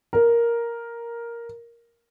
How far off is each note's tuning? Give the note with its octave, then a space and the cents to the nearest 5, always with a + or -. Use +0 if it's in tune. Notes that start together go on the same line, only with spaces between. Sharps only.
A#4 +5